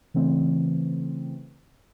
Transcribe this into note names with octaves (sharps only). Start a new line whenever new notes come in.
C#3 E3 A3 C4